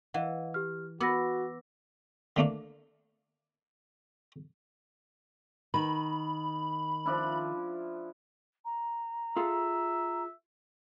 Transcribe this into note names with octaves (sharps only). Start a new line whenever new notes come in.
E3 D#5 F5 F#5
G4 F6
B3 F#4 D6 E6 A#6
D3 A3 A#3 D4
D#3 B5
F3 D4 E4
A#5
F4 G#4 A4 E5